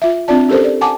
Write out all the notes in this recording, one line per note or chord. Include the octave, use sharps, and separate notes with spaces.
F4 E5
C4 D4 F4 D5 A5
C#4 G4 A4 A#4 C5
D5
F#5 G#5 A5 D6